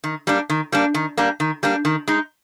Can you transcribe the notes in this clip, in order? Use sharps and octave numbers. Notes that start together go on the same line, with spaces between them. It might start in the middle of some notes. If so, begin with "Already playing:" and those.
D#3
G3 A#3 D4
D#3
G3 A#3 D4
D#3
G3 A#3 D4
D#3
G3 A#3 D4
D#3
G#3 D#4